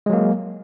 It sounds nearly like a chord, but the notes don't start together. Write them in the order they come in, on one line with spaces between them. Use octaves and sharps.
G#3 F#3 A#3